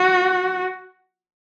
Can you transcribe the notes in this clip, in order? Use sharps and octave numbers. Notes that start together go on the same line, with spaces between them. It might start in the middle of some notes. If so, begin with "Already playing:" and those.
Already playing: F#4